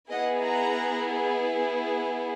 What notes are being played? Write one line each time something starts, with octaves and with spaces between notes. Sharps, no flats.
B3 E4 G#4 D#5 F#5
F#5 A#5